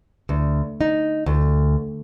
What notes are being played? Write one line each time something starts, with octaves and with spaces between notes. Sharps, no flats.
D2
D#4
D2